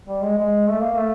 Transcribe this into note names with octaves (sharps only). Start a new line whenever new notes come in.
G3
G#3
G#3
A3
A#3
A3